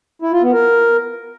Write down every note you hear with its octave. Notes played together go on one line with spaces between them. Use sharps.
E4
F4
B3
A#4